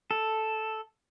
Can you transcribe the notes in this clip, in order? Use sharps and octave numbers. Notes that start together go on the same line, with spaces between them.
A4